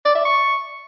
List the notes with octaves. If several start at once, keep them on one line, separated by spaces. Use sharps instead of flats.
D5
E5
C#6